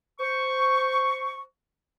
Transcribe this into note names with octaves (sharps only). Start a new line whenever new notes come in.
C5 C#6